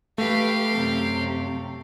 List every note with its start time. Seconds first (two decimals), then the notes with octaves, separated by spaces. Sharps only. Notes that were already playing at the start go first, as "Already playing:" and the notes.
0.18 A3 G4 B4 F5
0.71 F#2 C3